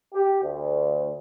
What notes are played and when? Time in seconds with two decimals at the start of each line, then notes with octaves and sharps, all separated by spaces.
0.14 G4
0.43 D2